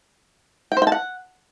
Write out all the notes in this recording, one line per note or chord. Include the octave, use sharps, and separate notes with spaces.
G5
C5
G5
A5
F#5